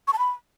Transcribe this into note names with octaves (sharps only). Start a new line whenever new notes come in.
C#6
A5
B5